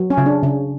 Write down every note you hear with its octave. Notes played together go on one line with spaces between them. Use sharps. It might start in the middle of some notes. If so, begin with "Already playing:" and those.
Already playing: F#3
C#4
C#3
D4
C#3